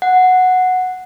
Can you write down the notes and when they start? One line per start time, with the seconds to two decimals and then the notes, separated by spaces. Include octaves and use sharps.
0.02 F#5